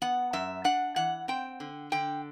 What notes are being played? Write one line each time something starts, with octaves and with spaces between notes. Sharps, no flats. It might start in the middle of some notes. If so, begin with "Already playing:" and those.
B3 F#5
F#2 E5
D4 F#5
E3 F#5
C4 G5
D3
D3 G5